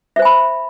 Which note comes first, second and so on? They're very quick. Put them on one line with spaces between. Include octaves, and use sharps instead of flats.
E5 C5 G#5 B5